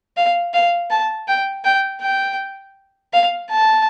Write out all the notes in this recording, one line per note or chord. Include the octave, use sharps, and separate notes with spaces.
F5
F5
A5
G5
G5
G5
F5
A5